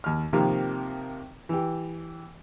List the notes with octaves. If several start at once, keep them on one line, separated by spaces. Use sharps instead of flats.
D#2 F6
C3 D#3 F3 A#3 C4
E3 G4